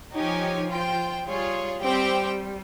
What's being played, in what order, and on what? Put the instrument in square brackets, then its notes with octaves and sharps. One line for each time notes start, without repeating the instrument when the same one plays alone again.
[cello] F3 [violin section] D#4 G4 C#5 G#5
[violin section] F4 C5 G5
[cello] G3 [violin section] F4 G#4 C#5
[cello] G3 [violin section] C4 G4 C5 G5